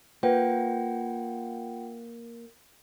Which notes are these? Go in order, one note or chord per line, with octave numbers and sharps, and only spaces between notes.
A#3 F4 B4 F#5 G5